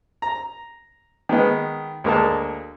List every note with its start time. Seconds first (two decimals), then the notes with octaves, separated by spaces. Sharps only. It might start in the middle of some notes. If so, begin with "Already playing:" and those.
0.22 A#5
1.29 D#3 G#3 B3
2.04 D2 G#3 A#3 A#4 A5